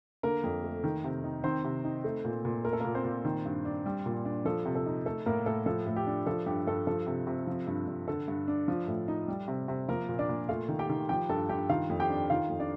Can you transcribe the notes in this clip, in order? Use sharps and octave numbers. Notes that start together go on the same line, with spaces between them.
D3 A#3 A#4
F2
A3
D#3
C3
D#4
D#3 C4 C5
C3
D#4
A3
A#2
A#2
A3 A#4
A4
A#2 A#3 A#4
C4 C5
A#2
D#3
G2
D4
G3
A#2
D4
F3 A4
C3
A4
D#4
A3 A4
A2 A#3 A#4
A2 A4
F3 A4
A2
G4
D4
F3 A4
G2 G4
G2 A4
F3 A4
C3
C3
F3
G2
G2
D3 A4
G2
D4
F3
A2
D#4
G3
C3
C3
F3 A#3 A#4
A#2
D4 D5
A#2
A3 F4 F5
D#3
G4 G5
D#3
F3 G4 G5
G2 A4 A5
G2 G4 G5
D#3 F4 F5
F2
G4 G5
D4
D#3 F4 F5
F2
D4 D5